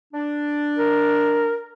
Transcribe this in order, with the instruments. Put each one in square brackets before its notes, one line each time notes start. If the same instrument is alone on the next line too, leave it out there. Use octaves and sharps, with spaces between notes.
[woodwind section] D4
[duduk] A#4